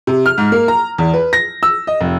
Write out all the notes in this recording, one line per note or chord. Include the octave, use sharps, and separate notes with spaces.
C3
F6
G#2
A#3
A#5
E2
B4
A#6
E6
D#5
F1